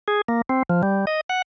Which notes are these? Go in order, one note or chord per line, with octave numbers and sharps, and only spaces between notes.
G#4
A#3
C4
F3
G3
D#5
F#5